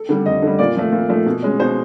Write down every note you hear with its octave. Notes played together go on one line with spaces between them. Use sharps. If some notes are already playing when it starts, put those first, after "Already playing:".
Already playing: A4
D3 G3
F2 D#5
D3 G3
A#2 D5
F3 A3
A#2
F3 A3
B2
G#3 C#4
B2 C5